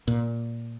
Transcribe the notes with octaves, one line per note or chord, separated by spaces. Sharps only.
A#2